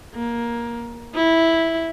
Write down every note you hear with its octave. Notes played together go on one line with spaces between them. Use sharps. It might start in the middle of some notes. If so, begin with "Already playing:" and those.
A#3
E4